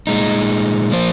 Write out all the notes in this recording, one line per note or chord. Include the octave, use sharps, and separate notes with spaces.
A#2 G#3 D#4
F3 A#3 F4 C5